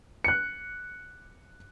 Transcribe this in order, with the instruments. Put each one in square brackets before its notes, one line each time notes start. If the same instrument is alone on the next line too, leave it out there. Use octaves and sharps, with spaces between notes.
[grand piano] F#6 C#7